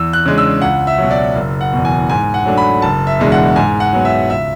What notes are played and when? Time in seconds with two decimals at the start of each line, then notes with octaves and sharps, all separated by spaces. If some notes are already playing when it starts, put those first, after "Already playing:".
Already playing: E2 E6
0.13 F#6
0.26 C#3 G#3 D4
0.38 E6
0.61 C#2 F#5
0.87 E5
0.98 B2 F#3
1.11 D5
1.36 F#1
1.61 F#5
1.73 E2 B2
1.85 G#5
2.09 G#2 G#5
2.34 F#5
2.45 F#3 A3 D4
2.58 B5
2.82 F#1 A5
3.07 E5
3.19 E2 B2 G#3 D4
3.32 F#5
3.56 G#2 G#5
3.80 F#5
3.93 F#3 B3
4.05 E5
4.29 C#2 E5